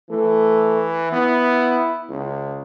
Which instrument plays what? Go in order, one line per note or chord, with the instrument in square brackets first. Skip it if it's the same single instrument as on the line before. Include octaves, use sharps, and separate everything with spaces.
[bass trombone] E3 [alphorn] A3
[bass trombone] B3 [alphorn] E4
[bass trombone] C#2